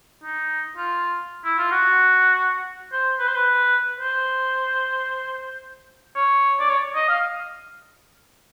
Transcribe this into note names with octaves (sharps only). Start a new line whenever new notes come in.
D#4
F4
E4
F4
F#4
C5
B4
C5
B4
C5
C#5
D5
C#5
D#5
F5